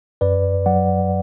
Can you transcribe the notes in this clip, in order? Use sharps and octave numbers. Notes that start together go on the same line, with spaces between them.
F#2 B4 D5
F#3 D5 F#5